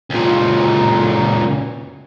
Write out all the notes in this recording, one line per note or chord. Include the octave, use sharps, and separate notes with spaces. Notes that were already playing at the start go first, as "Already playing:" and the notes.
C#2 A#2